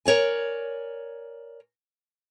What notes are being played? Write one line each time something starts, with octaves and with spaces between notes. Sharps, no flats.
A#4 C#5 D5 G#5